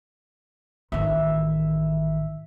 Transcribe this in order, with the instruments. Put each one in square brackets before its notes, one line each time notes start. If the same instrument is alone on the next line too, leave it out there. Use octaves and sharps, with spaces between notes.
[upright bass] A1 D#3 [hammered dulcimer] E5